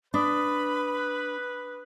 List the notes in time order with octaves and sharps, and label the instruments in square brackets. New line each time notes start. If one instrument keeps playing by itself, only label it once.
[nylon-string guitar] D4 [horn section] B4 [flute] B5 [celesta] D6 D#6